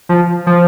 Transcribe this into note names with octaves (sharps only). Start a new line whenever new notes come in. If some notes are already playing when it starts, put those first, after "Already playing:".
F3
F3